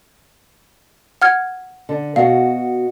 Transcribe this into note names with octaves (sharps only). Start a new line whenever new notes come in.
F#5 F6 G#6
D3
B2 F#4 F5